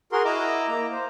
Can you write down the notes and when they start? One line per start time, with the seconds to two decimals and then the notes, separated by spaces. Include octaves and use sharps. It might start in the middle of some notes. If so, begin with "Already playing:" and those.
0.12 F#4 G#4 A#4 C6
0.25 E4 D#5 A#5 D6 E6
0.68 A#3 A#5
0.92 C5